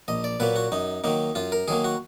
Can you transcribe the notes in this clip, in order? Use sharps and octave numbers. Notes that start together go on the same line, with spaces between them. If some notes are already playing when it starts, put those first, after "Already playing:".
A#1 D#5
D5
A#2 F#3 A#3 B4
F#4
F#2 D#4
D#3 F#3 A#3 D#4
F#2 F4
A#4
D#3 F#3 A#3 G#4
F#4